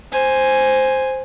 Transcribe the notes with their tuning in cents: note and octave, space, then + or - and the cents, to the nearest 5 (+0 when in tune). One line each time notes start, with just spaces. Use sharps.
C5 +0 G#5 +0